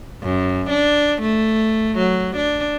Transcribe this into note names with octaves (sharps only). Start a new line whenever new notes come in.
F#2
D4
A3
F#3
D4